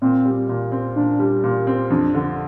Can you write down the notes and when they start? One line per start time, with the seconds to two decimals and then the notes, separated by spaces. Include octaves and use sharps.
0.02 A#2 C4
0.25 G3
0.49 A#2
0.72 C4
0.96 A#2 D4
1.19 G3
1.44 A#2
1.67 C4
1.90 F2 D4
2.14 D3